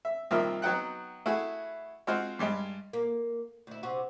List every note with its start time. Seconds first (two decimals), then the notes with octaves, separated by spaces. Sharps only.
0.05 E5
0.31 C2 D#3 F3 A#3 F4 E5
0.62 F#3 B3 D#4 F#5 G5 F#6
1.26 A3 E4 F#4 G#4
2.07 G#3 C4 F4 F#4
2.39 G2 G3 G#3
2.93 A#3
3.67 D2 E4
3.83 C3 F#4